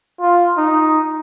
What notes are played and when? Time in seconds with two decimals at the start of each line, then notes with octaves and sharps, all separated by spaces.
0.21 F4
0.57 D#4